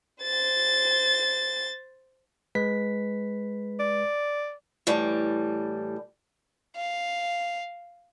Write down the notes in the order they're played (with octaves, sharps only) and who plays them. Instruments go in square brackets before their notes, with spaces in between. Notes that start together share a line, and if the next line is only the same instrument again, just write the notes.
[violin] C5 A6
[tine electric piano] G#3 B4 B6
[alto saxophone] D5
[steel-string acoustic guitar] A2 E3 G3
[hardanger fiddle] F5